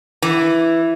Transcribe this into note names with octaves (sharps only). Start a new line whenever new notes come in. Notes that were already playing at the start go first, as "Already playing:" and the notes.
E3